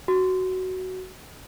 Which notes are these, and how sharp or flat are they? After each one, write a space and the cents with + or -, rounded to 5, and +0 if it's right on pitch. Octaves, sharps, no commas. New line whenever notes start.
F#4 +10